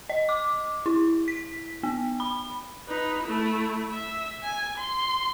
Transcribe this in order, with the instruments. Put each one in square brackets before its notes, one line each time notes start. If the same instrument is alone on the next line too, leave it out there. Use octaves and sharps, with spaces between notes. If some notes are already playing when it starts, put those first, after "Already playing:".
[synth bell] D#5
D6
E4
B6
B3
B5
[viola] D#4 B4
A3 E4
E5
G#5
C6